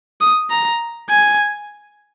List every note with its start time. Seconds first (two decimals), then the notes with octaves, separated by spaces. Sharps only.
0.21 D#6
0.50 A#5
1.10 G#5